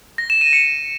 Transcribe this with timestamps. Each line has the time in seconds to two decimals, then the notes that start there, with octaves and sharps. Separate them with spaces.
0.18 A#6
0.30 E7
0.41 D#7
0.53 C#7